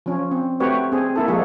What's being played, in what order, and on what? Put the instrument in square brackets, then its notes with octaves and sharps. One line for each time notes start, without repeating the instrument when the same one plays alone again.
[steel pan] F3 C#4
C4
A3 C4 F#4 G4 B4 C#5
C4 G#4
A#3 E4 A4
F3 G3 G#3 A#3 F#4 G#4